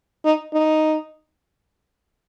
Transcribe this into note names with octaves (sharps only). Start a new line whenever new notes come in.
D#4
D#4